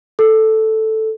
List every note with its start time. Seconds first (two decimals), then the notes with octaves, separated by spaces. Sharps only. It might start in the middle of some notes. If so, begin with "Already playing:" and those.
0.19 A4